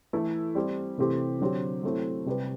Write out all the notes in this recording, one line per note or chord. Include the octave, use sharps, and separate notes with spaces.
E3 A3 E4 A4
G3 C4 G4
C3 E3 A3 C4 G4
D3 F#3 C4 G4
F#3 A3 C4 E4
C3 G3 C4 G4 B4